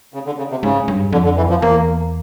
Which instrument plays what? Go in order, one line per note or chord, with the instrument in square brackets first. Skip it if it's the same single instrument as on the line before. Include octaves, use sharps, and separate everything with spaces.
[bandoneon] C#3
D3
C#3
C3
[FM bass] G#2 [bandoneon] C#3
[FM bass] G2
[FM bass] F2 [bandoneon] D3
[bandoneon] D3
E3
F3
[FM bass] E2 [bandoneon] A#3